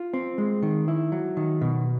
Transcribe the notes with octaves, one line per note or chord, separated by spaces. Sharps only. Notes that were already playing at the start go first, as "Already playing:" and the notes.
Already playing: F4
C4
G#3
D#3
E4
F#3
D#3
B2